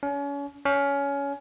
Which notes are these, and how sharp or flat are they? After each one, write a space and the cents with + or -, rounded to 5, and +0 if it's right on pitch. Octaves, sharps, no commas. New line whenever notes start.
C#4 +35
C#4 +20